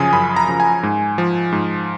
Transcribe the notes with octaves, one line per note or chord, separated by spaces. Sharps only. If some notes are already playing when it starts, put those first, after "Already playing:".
Already playing: F#2 C#3 F3 G#5 D#6
F#2 B5
A#5
C#3 F3
G#5
G#2
F3
G#2